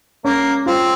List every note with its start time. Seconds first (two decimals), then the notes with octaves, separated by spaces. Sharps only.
0.25 A#3 C#4
0.66 C4 F4